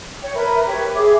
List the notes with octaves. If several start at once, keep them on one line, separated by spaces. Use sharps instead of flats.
C#5 G5
A#4 B4 E5 B5
G4 B4 C#5
G#4 E5 D6